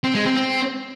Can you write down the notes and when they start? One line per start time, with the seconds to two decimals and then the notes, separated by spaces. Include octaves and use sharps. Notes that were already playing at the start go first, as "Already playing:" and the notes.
0.04 C4
0.15 G#3
0.26 C4
0.37 C4